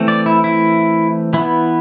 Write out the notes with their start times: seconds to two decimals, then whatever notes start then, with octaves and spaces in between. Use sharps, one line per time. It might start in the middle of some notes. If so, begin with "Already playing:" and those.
Already playing: E3 A3 C4
0.08 D5
0.26 E4
0.44 E4
1.33 E3 B3 E4